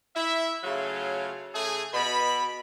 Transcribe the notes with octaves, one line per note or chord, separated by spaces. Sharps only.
E4 E5
C#3 F#3 A3 F4 F5
C#3 A3 G#4
B2 B5